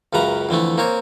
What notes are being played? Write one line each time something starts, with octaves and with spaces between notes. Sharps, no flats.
C#2 F#2 C#3 B4 A#5
F2 D3 E3 A3
A#3 C4 C#5